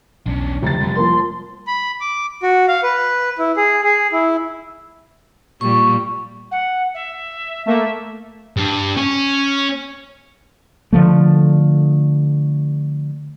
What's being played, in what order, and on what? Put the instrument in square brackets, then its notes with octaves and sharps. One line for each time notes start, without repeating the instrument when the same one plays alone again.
[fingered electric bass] B1 E2 [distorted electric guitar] C#4 D4
[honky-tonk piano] F1 A6 [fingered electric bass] D2 C#3 [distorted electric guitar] G2
[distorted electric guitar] F#2 [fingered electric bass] G3 C4
[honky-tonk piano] F3 A#3 [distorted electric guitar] C6
[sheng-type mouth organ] B5
D6
F#4
F5
B4
E4
G#4
G#4
E4
[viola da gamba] A#2 G3 A#3 [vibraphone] C#6
[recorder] F#5
E5
[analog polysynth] A3 A#3 [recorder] E5
[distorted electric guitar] G2
C#4
[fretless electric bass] D3 D#3 F3 A3